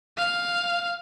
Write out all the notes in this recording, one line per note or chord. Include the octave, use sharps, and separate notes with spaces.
F5